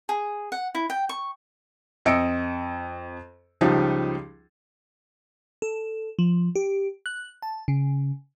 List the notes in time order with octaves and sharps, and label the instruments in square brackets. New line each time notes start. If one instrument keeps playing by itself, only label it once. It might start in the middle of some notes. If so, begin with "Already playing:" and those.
[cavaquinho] G#4
F#5
E4
G5
C#6
[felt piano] F2 D#5 E6 C#7 D7
C#2 F3 G3 D#4
[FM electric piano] A4
F3
G4
F#6
A5
C#3